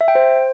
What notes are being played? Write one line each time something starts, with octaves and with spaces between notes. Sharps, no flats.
E5
G5
C5